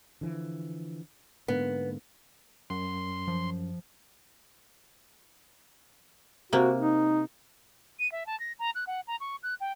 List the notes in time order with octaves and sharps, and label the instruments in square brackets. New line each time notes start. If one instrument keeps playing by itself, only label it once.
[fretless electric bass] D3 E3 F3
[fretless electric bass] G#2 D3 A#3 [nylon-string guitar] B3
[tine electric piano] F#2 [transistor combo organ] C6
[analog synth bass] F3
[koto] C3 A#3 [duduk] F#4
[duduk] D#4
[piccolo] D#7
E5
A5
A#6
A#5
F#6
F#5
A#5
C#6
F#6
G5